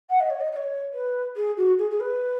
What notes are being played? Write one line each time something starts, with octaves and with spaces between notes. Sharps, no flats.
F#5
D#5
C#5
D#5
D#5
C#5
B4
G#4
F#4
G#4
G#4
B4